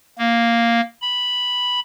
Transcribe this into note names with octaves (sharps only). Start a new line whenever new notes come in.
A#3
B5